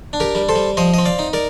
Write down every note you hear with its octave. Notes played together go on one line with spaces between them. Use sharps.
D4
G4 A#4
G3
A4 C5
G3
F3 C5 D#5
C4 D#5
D5 F5
D#4
A#4 D5